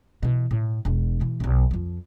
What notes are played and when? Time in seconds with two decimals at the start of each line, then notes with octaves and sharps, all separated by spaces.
0.23 B2 E3
0.51 A2
0.85 E1 D4
1.20 B2 E3
1.40 B1 F#2
1.71 F2 F3